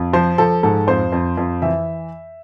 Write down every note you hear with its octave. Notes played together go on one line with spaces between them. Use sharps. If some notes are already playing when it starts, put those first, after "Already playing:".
Already playing: F2
F3 C5
F3 A4
G#2 A4
F2 C5
F2
F2
E3 E5